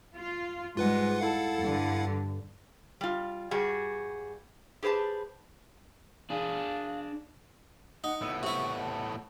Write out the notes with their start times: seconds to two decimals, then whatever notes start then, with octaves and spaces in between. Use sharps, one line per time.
0.16 F4
0.77 G#2 G3 G#3 F4 B4 F#5
1.20 E4 A4 F5 F#5
1.59 G2 D3
3.01 G3 F4
3.51 G2 G3 F#4 G#4
4.83 G4 G#4 B4 C5 A5
6.30 D4 G#4 F5
8.04 D#4 F#5
8.21 A2 B3 E6
8.43 C3 E4 C#6
8.81 A5